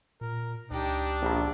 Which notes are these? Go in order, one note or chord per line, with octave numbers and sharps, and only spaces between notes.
A#2 A#4
C#2 D4 D#4 G4
A#1